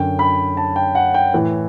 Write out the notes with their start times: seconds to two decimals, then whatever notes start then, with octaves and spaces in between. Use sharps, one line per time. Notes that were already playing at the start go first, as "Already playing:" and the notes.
Already playing: F#2 D3 G5
0.19 B5
0.57 A5
0.76 G5
0.95 F#5
1.14 G5
1.34 A2 E3